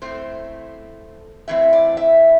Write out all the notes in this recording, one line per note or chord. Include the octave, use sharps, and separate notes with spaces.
A2 A3 C4 C5
A2 E3 C4 E5
D5
E5